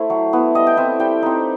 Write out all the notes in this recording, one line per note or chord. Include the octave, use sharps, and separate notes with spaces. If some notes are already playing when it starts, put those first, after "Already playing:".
Already playing: A3 E4 C5
F#3
B3 E4
G3 D#5
G5
C4 E4 E5
G3 G5
C4 D#4